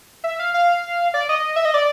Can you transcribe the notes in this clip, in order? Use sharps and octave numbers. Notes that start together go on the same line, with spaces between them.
E5
F5
F5
D5
D#5
E5
D#5
D5